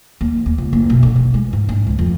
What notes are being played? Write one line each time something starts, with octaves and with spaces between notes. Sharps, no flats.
D#2
D#2
C#2
F#1
B1
D3
D#3
G#3
G#2
D4
C#2
F2